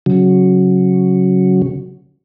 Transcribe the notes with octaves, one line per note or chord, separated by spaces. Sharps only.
C#3 F#3